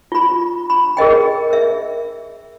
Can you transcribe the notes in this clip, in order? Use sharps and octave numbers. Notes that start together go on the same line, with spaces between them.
F4 B5
B5
G#4 A#4 D#5 G5
A#4 E5